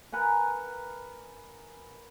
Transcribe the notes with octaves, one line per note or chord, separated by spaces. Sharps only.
A#4 B4 F#5 G#5